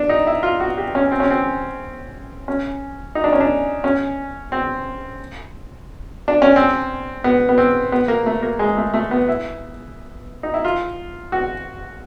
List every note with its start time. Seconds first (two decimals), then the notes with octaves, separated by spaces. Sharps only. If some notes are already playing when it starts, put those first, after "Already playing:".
Already playing: D4
0.09 D#4
0.27 E4
0.43 F4
0.60 F#4
0.78 G4
0.95 C#4
1.12 C4
1.20 C#4
1.30 C4
2.48 C#4
3.15 D#4
3.24 D4
3.33 C#4
3.40 D4
3.84 C#4
4.52 C4
6.28 D4
6.42 C#4
6.56 C4
7.24 B3
7.49 B3
7.58 C4
7.92 B3
8.08 A#3
8.26 A3
8.42 A#3
8.59 G#3
8.77 A3
8.94 A3
9.11 B3
9.28 E4
10.43 D#4
10.54 E4
10.65 F4
11.32 F#4